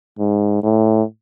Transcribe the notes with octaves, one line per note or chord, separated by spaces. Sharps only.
G#2
A2